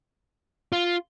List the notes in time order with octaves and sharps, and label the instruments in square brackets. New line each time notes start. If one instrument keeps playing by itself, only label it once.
[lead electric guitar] F4